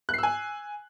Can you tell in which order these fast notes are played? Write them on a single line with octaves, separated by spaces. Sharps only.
F#6 C7 E6 G#5